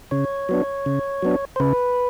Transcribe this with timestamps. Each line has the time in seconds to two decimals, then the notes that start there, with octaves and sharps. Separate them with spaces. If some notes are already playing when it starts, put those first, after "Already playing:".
0.11 C#3 C#5
0.49 F#3 B3 D4
0.86 C#3
1.22 F#3 B3 D4
1.56 C5
1.60 C#3 B4